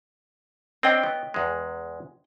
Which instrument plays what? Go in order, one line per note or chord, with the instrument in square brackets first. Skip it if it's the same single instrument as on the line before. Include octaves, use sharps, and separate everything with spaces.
[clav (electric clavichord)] C4 D4 [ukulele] C#5 D#5 G5
[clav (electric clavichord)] B3
E2 G#3